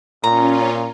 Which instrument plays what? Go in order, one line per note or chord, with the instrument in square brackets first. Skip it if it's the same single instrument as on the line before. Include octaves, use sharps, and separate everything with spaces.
[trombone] A#2 [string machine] C#4 F4 [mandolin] A#5